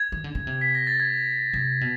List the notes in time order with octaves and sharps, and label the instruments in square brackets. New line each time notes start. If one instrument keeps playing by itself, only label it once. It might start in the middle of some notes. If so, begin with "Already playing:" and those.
Already playing: [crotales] G#6
[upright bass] D#3
D3
C#3
C3
[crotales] B6
A#6
A6
G#6
[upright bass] C3
B2